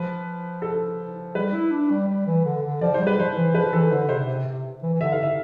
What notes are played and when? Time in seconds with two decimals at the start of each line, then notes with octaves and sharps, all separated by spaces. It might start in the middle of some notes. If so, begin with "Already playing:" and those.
Already playing: F3 B4
0.62 A4
1.35 G3 B4
1.54 E4
1.71 D4
1.91 G3
2.08 G3
2.27 E3
2.45 D3
2.63 D3
2.81 F3 D5
2.94 C5
3.00 G3
3.07 B4
3.18 F3 C5
3.36 E3
3.55 F3 B4
3.73 E3 A4
3.91 D3 C5
4.09 C3 C5
4.27 C3
4.46 C3
4.83 E3
4.94 E3
5.01 D3 E5
5.12 F5
5.18 D3 E5